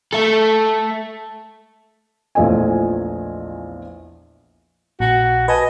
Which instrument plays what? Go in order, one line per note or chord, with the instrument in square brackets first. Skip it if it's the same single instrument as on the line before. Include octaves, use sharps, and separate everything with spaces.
[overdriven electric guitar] A3 A4
[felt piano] A#1 E2 F3 A3 D#5 G#5
[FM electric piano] A#1 [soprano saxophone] F#4
[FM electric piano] B4 G#5 A5 [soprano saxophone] D#5